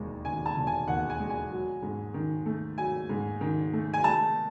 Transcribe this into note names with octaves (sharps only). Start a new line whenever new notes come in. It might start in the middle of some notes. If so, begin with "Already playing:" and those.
Already playing: E1 D#2 G#3
D#3 G#5
A5
E1
G#5
D#2 F#5
G#5
G#3
G#5
F#3
G#2
D#3
A3
F#3 G#5
G#2
D#3
A3
G#5
G#3 A5